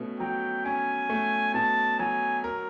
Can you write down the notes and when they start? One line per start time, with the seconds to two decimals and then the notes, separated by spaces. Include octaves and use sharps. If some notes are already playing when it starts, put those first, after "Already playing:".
Already playing: B2 A3 C#4
0.20 F#3 G5
0.65 C#4 G#5
1.10 A3
1.54 B2 A5
1.99 F#3 G#5
2.44 A#4